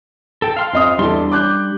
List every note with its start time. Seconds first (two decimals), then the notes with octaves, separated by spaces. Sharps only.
0.42 A4 G5
0.57 F5 C6 F6
0.73 F2 D#5 D#6
0.99 E2 G3 D4 E4 A4 C6
1.31 D6 F#6 G6